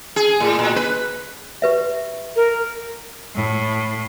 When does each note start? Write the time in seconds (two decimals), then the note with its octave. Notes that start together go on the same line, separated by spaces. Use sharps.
0.16 G#4
0.40 A2
0.59 A#2
0.76 B4
1.62 G4 B4 E5
2.36 A#4
3.36 A2